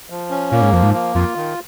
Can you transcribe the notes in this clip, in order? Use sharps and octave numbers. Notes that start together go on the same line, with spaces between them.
F3
C#4
A#2 A#3
G#2
F2 F3
G#2
A#3
F2 F4
D#3